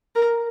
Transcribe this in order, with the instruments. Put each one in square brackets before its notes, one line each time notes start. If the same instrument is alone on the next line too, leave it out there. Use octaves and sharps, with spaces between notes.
[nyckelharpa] A#4